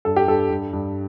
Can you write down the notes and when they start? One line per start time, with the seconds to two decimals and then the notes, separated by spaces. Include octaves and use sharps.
0.05 G2 A4
0.16 G4
0.28 G2 A4
0.50 G2
0.73 G2